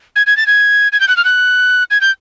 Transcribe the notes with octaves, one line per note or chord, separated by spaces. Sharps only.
G#6
G#6
A6
G#6
G#6
G6
F#6
F6
F#6
G#6
G6